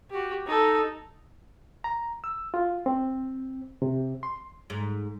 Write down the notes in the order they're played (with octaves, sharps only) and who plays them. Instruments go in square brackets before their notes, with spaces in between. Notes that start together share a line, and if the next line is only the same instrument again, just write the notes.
[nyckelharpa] F#4 G4
D#4 A4
[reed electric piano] A#5
E6
F4
C4
C3
C6
[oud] G#2